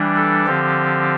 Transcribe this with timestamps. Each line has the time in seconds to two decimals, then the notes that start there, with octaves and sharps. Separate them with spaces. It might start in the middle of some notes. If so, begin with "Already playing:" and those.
Already playing: E3 G3 D4
0.16 A4
0.46 D3 F3 C4 G4